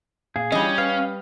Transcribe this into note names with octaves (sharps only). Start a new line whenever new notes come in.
A#2 G#4 F5
E3 G3 C#4 D4 F4 D#5
B4 F5